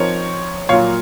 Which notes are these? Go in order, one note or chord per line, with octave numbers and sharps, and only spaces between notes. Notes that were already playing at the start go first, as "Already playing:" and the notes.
Already playing: F3 C4 D#4 A#4 C#5
A#2 F#3 A#3 F4 C#5 F5